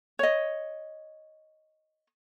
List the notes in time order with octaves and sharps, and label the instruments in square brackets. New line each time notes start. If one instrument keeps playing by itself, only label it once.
[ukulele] C#5 D#5